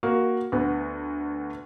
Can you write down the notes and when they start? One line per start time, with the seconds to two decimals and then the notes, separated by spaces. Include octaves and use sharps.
0.03 A#3 F#4
0.52 D2 B3